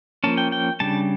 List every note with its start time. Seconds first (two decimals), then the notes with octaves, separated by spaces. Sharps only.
0.24 F3 A#3 C#4 A5
0.37 G5
0.52 G5
0.80 C#3 G3 D4 A5